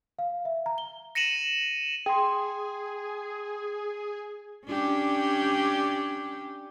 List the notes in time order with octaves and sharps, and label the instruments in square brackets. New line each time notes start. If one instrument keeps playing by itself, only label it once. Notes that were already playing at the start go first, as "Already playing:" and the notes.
[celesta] F5
E5
A#5
G7
[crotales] A#6 C#7 D#7 E7 F#7
[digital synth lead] G#4 [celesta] G5 C6
[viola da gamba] C#4 D4 G4